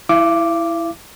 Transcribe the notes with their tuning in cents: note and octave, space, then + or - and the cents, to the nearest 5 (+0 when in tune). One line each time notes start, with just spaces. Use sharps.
E4 +0 F5 -45 D6 +0